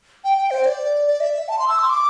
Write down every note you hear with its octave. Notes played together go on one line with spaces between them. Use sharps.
G5
G5
C5
D5
D5
E5
E5
A5
C6
E6
C6
D6